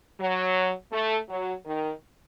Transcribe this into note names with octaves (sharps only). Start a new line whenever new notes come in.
F#3
A3
F#3
D#3